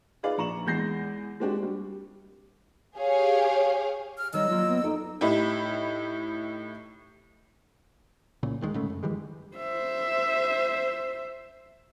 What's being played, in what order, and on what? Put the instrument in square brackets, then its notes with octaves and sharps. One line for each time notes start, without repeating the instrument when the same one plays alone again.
[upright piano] D#4 F4 G#4 B4 D5 F5
A#1 A#5 C#6 E7 F#7
E2 G#3 G6 A#6 C7
G#3 C4 D4 F#4 G4
G3
[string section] G4 G#4 C#5 F5
[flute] F6
[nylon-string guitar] D#3 C#5 [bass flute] G3 [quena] D#5 [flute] E6
[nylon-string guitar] F#3 A#3 [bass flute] F4
[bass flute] B3
[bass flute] D#4 [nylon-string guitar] A4 D5 D#5
[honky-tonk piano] A2 D#4 E4 G4
[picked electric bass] C2 A#2 C#3
D2 D#3 G3 G#3
G#2 C#3 A3
F#2
D#3 E3 G3 G#3
[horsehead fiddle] C5 E5